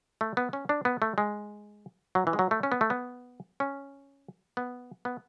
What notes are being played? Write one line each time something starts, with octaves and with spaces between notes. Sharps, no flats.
A3
B3
C#4
D4
B3
A3
G#3
F#3
E3
G#3
F#3
A3
C#4
B3
A3
B3
C#4
B3
B3